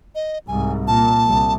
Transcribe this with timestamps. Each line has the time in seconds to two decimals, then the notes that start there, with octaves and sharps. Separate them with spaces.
0.15 D#5
0.48 C2 G#2 G#5
0.87 A#2 A5
1.26 C2